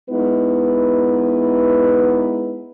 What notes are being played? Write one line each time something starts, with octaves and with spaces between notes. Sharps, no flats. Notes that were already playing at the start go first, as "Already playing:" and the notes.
G#3 B3 D#4 E4 B4